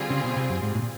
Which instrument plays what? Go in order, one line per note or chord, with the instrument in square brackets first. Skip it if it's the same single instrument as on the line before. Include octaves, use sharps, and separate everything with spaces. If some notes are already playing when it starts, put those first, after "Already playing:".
Already playing: [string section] D3 G3 C4 F4 G#4
[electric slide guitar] C#3
B2
C3
F#2
G#2
A2
A#2